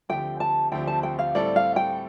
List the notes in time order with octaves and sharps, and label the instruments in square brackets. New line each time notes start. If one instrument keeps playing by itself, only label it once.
[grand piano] D2 D3 F3 C4 G4 [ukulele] G5
[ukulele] A5
[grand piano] D2 D3 F3 C4 G4 [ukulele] G5
[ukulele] A5
G5
F5
[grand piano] A2 G3 C4 A4 [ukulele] D5
[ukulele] F5
G5